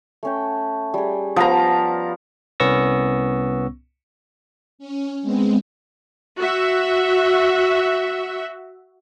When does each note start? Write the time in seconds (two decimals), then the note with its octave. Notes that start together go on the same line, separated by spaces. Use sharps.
0.23 A3 C#4 G5
0.94 G3 G#4
1.36 F3 B3 F5 A5 A#5
2.60 C2 B3 C#4 C#6 E6 A#6
4.79 C#4
5.22 G#3 B3 C4
6.38 F#4 E5